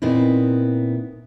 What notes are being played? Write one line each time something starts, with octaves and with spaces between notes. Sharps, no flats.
A#2 B3 C4 D#4 E4